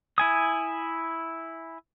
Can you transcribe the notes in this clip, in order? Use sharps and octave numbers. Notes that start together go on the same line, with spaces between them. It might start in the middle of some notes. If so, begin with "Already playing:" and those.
E4 G#5 D#6